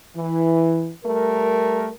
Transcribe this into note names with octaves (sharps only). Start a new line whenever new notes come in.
E3
G3 A3 A#4